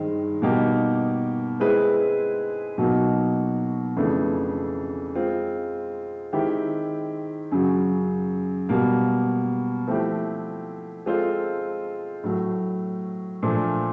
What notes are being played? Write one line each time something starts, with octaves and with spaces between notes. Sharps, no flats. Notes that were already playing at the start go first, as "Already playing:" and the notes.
Already playing: G2 D#3 G#3 C4 D#4
B2 G3 A#3 D#4 G4
G#3 C4 E4 G#4 B4
B2 F#3 A#3 D#4
F2 C#3 E3 A3 D4
G#3 C4 F4
D#3 G#3 C4 E4 G4
F#2 C#3 F#3
B2 G3 A#3
F3 A3 C4 E4 G4
G#3 C4 F4 A4 C5
A2 F#3 A3
A#2 F3 A3 D4